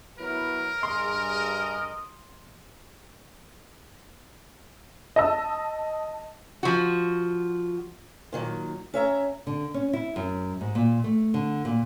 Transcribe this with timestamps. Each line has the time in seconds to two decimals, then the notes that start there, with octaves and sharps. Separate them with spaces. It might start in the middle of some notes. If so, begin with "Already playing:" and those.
0.19 F#3 B3 E4 A#4 B4
0.83 G2 G#4 D#5 C6
5.16 D#5 A5 E6
6.63 F3 F#4
8.33 A#2 D#3 F#3
8.94 C#4 E5 A#5
9.47 D3
9.74 C#4
9.93 E4
10.16 F#2
10.61 G#2
10.75 A#2
11.04 A3
11.34 D3
11.65 A#2